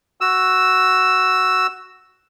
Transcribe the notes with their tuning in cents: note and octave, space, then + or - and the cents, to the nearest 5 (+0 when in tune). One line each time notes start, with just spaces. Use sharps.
F#4 +0 E6 +0